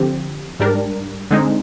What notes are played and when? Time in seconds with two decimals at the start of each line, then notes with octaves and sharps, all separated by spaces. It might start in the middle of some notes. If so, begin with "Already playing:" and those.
Already playing: D3 F3 C4 G4
0.60 G#2 G3 D4 G4 A#4
1.31 D3 G#3 C4 D#4